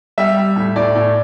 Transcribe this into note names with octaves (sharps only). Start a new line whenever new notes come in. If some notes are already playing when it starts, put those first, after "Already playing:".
G3 E5
G3
A2
A2 D5
A2